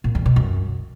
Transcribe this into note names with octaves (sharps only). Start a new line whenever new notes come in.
A#2
E2
B2
F#2